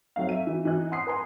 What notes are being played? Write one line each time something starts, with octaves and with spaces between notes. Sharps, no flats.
F#3 A3 C4 D#4 E5 F5
E5 D#7
E3 D#4
E3 D#4 D#5 F#6
F#5 C6 D#6 F#6 C7
B4 G#5 A#5 C6